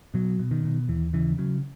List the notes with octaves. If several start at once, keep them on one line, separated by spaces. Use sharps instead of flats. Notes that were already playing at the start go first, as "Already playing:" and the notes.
B2 F#3
B2
D#3
B2
D#2 E3
C#3 E3
C#3 F#3